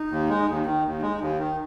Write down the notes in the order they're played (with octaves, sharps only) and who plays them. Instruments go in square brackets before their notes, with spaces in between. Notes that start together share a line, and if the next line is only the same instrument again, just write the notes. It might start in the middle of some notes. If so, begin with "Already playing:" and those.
Already playing: [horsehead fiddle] D#4
[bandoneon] D#2
G#3
D#2
[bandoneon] D#3 [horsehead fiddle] D#4
[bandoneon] D#2
G#3
D#2
D#3